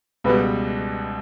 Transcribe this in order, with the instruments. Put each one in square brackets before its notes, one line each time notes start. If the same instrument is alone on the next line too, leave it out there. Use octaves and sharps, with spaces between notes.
[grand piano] C#2 B2 G3 [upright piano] B4